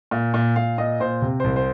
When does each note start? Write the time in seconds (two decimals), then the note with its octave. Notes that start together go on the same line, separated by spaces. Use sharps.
0.11 A#2
0.34 A#2
0.56 A#2 F5
0.78 A#2 D#5
1.00 A#2 C5
1.22 C3
1.40 C2 C5
1.56 C5